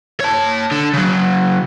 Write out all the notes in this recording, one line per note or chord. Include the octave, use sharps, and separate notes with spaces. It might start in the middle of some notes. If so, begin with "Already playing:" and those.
C#5 A5
D3
C#3 F#3